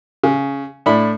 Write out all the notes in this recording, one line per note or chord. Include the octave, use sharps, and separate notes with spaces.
C#3
A2 D4 E4 B5